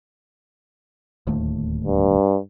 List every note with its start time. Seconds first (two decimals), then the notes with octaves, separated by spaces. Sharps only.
1.27 D1 D#2 A3
1.85 G2